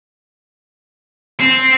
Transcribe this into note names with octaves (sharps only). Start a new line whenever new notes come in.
C4